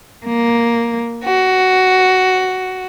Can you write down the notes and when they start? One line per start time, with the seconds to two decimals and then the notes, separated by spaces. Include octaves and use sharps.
0.24 A#3
1.24 F#4